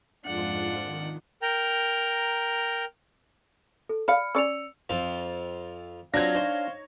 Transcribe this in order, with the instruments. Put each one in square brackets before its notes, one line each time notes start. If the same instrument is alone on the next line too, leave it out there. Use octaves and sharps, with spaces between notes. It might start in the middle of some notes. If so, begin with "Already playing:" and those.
[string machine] F2 G#2 F4 [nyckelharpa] D4 F#5
[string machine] D#3
[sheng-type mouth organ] A#4 G5 A#5
[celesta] A4
[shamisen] D5 F5 [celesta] B5 F6 C#7
[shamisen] C#4 D5 [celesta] E6 C#7 F7
[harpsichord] F2 C4 F4
[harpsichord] F#3 C4 F4 [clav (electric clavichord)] D4 [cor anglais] F5 [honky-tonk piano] G#6 A#6
[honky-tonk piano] D#4 C#5 [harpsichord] C5